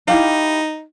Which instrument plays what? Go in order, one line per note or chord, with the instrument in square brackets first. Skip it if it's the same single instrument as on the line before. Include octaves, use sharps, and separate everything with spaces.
[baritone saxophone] D#4 [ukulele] E4 G4 F5